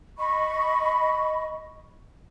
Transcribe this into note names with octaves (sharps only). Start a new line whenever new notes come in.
D#5 B5 C#6